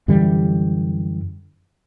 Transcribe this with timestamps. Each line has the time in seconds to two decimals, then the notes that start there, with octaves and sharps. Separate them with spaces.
0.08 F#2 D3 E3 G3